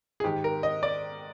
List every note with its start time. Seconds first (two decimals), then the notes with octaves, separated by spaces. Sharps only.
0.20 G#4
0.24 G#2 D#3 G4
0.44 A#4
0.63 D#5
0.83 D5